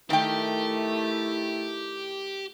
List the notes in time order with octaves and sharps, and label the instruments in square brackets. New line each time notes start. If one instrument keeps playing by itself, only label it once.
[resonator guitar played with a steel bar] D#3 G5 [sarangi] A3 [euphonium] E4 [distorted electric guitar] G4